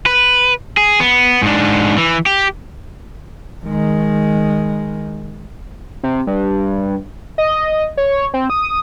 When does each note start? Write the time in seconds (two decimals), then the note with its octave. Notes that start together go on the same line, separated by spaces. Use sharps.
0.06 B4
0.77 G#4
1.00 B3
1.42 G#2 D4
1.98 E3
2.26 G4
3.65 D#3 G#3
6.03 C3
6.27 G2
7.38 D#5
7.97 C#5
8.34 C4
8.50 D#6